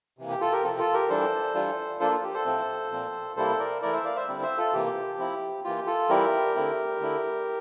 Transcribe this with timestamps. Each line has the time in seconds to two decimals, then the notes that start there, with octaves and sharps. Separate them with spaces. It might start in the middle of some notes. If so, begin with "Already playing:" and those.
0.18 C3 E3 A#3
0.30 G4
0.41 F4 A4
0.52 G4 A#4
0.63 C3 F3 C4 F4 A4
0.79 F4 A4
0.94 G4 A#4
1.09 E3 G3 D4 A4 C5
1.54 E3 G3 D4 F4
2.00 F3 A#3 D4 F4 A4 C5
2.12 F4
2.23 G4
2.34 A4 C5
2.45 A2 F3 A3 C4
2.91 A#2 F3 C4
3.37 C3 G3 A#3 E4 A4 C5
3.59 A#4 D5
3.82 E3 A3 E4 A#4 D5
3.93 C5 E5
4.05 D5 F5
4.16 C5 E5
4.28 D3 G3 C4 E4
4.43 C5 E5
4.58 F4 A4
4.73 C3 E3 A#3 G4
5.19 F3 C4 E4
5.64 E3 A#3 F4 G4
5.87 F4 A4
6.09 E3 G3 C4 E4 G4 A#4
6.55 D3 A3 C4 E4
7.00 D3 A3 E4